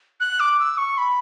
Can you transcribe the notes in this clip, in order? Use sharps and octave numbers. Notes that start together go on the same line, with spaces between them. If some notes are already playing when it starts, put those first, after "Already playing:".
F#6
D6
E6
C#6
B5